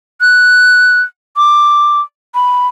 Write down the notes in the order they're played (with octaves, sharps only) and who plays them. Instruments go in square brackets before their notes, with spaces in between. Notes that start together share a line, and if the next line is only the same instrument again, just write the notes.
[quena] F#6
D6
B5